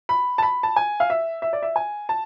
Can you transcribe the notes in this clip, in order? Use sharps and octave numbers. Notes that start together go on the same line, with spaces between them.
B5
A5
B5
A5
G#5
F5
E5
E5
D5
E5
G#5
A5